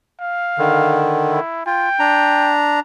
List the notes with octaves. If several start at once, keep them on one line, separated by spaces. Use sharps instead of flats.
F5
D3 D#3
E4
F4 G5
D4 A#5